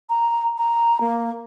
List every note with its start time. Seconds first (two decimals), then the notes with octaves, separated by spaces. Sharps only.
0.10 A#5
0.58 A#5
1.01 A#3